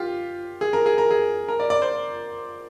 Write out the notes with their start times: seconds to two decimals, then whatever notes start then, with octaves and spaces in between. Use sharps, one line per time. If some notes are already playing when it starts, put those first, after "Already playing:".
Already playing: F4 G4
0.61 G#4
0.73 A#4
0.86 G#4
0.98 A#4
1.11 G#4
1.48 A#4
1.60 D5
1.70 D5
1.82 C5